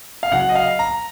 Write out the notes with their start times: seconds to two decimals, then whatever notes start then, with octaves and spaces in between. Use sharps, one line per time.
0.23 F5
0.31 C#3 F#3 F#5
0.49 D#5
0.55 F5
0.79 A#5